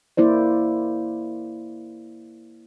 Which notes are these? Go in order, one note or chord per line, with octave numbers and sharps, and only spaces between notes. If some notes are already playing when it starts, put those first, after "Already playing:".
A#3 E4 C5 D5